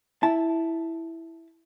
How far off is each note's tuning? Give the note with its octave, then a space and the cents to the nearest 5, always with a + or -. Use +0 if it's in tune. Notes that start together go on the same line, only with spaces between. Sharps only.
E4 +0 A5 +0